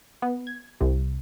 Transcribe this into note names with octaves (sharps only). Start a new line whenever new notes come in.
B3
G#6
C2 C3